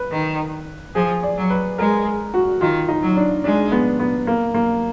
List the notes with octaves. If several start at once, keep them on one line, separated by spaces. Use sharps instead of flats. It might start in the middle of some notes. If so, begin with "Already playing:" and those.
Already playing: B4
D#3
F3 G#4
D5
F#3
B4
G#3 A#4
F#4
D#3 F4
D#4
F#3
D4
G#3 D4
B3
B3
A#3
A#3